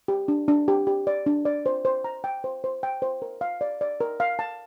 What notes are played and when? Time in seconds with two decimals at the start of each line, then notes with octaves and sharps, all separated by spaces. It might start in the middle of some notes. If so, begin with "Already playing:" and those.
0.08 G4
0.28 D4
0.48 D4
0.68 G4
0.87 G4
1.07 D5
1.26 D4
1.45 D5
1.66 C5
1.85 C5
2.04 A#5
2.24 G5
2.44 C5
2.64 C5
2.83 G5
3.02 C5
3.22 A#4
3.41 F5
3.61 D5
3.81 D5
4.01 A#4
4.20 F5
4.39 A5